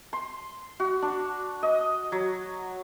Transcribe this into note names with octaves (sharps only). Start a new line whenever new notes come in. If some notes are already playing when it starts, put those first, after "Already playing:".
C6
F#4
D4
D#5
F#3